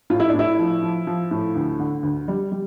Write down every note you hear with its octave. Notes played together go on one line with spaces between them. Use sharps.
A2 F4
E4
A2 D4
E4
F3
F3
F3
A2
D2
D3
D2
G3
G3